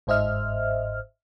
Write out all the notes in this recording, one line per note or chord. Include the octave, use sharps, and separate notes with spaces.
G1 G#2 C5 D#5 E5 F6